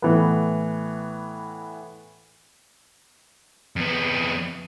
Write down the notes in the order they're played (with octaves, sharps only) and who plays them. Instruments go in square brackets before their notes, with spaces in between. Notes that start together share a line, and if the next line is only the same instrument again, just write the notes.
[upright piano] A2 E3 B3
[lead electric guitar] F2 B3